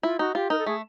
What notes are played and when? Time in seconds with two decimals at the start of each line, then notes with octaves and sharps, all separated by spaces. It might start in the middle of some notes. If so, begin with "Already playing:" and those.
0.03 E4 F4
0.19 D#4 F#4
0.35 F4 G4
0.50 D#4 A#4
0.59 A4
0.66 A3 G#4